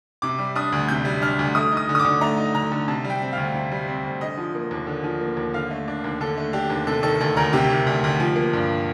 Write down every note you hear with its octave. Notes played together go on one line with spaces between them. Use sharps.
C3 D6
G3
D4 D#6
D2
C3 G6
G3
D4 F6
D2
A3 D#6
D#4
D#6
D3
D#6
D6
D3
A3 A#5
D#4
D3 A#5
D3
C3 A5
G3
G5
C4
D2 F5
C3
G3
C4
D2
D3 D#5
F3
A#3
D#2
D3
F3
A#3
D#2
D3 F5
A3
D4
D#2
D3 A4
A3
D4 G4
D#2
C3 A4
D#3 A4
D2 A4
D2 A#4
C3 G4
D#3
D2
D2
F3
A#3
G2